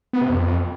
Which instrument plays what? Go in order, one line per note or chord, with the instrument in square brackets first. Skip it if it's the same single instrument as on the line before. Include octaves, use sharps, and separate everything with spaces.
[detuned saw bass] B3
C3
F2